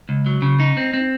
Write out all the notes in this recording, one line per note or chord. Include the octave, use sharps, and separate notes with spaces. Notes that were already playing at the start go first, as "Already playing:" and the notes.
C#2
F#3
C#3
D#4
C4
C4